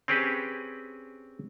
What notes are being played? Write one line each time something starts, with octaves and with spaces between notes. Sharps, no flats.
C4 C#4 G4 G#4 B4